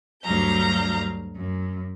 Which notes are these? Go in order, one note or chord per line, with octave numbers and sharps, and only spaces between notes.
D2 G2 F#3 F5 A#5 G6
F#2